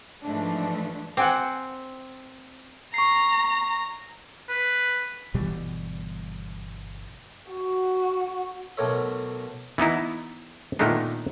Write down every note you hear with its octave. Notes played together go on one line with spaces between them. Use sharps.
G#2 E3 F3 A3 D4
C4 F#5 G#5 D6
A#5 C#6 C7
B4
G1 B2 E3 G3
F#4
B1 B2 A3 A#4 C#5 E5
E3 B3 D#4 E4
A#2 D#3 A3 B3 D4 D#4